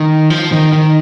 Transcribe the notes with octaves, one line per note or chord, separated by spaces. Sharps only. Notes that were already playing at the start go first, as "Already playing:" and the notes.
Already playing: D#3
F3
D#3
D#3